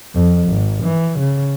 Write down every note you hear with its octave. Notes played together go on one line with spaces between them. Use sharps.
F2
G#1
E3
C#3